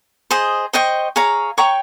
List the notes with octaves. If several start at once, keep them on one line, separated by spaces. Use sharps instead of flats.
G#4 C5 D#5
C5 D#5 G5 C#6
G#4 C#5 F5 A#5
C#5 G5 A#5 C#6